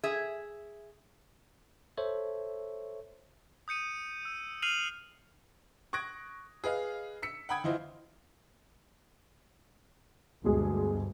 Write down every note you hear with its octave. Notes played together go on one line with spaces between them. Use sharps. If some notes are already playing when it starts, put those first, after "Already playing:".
G#4 E5
A4 C5 C#5 E5
D#6 G6 C#7 D#7
E6
F6 C7 D#7 F7 F#7
C#6 D#6 F#6 G#6 A#6 D7
G#4 B4 D#5 F5
E6 B6 C#7
F#5 G5 B5 D#6 G#6
E3 E4 F4 C5 D#5
D2 G2 B2 G#3 G#4